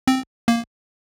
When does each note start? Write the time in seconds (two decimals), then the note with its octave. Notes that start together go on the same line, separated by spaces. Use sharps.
0.08 C4
0.48 A#3